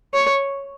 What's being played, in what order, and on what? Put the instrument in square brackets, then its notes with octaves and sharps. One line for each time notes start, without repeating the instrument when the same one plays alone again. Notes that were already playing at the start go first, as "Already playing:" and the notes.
[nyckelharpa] C#5